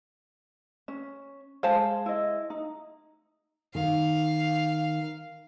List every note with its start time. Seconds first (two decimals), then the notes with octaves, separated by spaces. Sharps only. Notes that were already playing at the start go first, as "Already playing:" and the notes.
0.88 C#4
1.63 G#3 C5 F5 A5
2.06 E4 D#5
2.50 D#4
3.75 D#3 F5